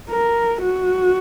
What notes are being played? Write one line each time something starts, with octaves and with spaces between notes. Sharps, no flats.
A#4
F#4